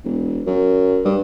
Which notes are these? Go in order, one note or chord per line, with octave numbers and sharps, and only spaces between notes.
E1
F#2
G2